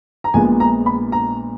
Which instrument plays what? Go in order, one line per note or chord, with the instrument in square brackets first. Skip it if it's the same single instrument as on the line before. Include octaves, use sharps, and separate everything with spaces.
[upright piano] A#5
A#1 A#2 G#3 B3 G#5
A#5
B5
A#5